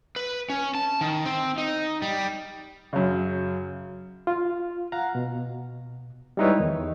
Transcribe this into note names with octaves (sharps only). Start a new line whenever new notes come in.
B4
C#4
A5
D#3
C4
D#4
G3
F#2 C#3
F4
F5 F#5 A#5
B2
G3 G#3 D#4 E4 B4 C#5
E2 D#3